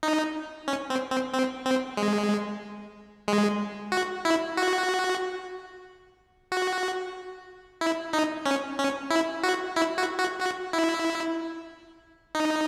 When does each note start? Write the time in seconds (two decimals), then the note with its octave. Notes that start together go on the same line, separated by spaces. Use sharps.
0.03 D#4
0.68 C#4
0.90 C4
1.12 C4
1.34 C4
1.66 C4
1.97 G#3
3.28 G#3
3.92 F#4
4.25 E4
4.57 F#4
6.52 F#4
7.81 E4
8.13 D#4
8.46 C#4
8.79 C#4
9.10 E4
9.43 F#4
9.76 E4
9.98 F#4
10.19 F#4
10.40 F#4
10.73 E4
12.35 D#4